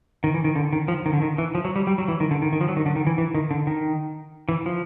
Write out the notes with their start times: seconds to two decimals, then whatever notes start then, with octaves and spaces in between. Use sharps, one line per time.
0.24 D#3
0.34 E3
0.44 D#3
0.56 D3
0.73 D#3
0.88 F3
1.06 D#3
1.13 D3
1.22 D#3
1.38 E3
1.55 F3
1.65 F#3
1.76 G3
1.87 G3
1.98 F#3
2.08 E3
2.20 D#3
2.31 D3
2.42 D#3
2.53 D#3
2.61 F3
2.68 F#3
2.77 D#3
2.86 D3
2.96 D#3
3.07 E3
3.18 E3
3.35 D#3
3.51 D3
3.67 D#3
4.49 E3
4.66 F3